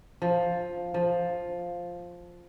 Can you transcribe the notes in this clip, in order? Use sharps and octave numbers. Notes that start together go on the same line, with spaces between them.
F3
F3